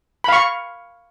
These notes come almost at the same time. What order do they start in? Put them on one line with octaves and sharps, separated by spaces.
B5 F5 C#6